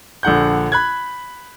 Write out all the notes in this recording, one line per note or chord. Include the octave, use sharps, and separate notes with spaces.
A#1 D3 F#5 G6
B5 F#6 G#6